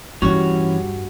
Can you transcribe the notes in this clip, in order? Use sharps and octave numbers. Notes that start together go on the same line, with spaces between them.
G2 E3 G3 C#4 F#4